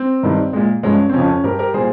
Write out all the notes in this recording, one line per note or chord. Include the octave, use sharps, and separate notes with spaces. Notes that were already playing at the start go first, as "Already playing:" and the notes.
Already playing: C4
G2 D#3 G3
A#2 G#3
G2 F3 G#3 C#4
C4
F2 C#3 F3 C#4
C#4
G2 G3 G4 A#4
G4 A#4
A#2 G3 G#4 C5